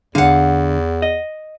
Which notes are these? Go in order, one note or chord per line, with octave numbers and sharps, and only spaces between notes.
E2 D3 F5 F#5
D#5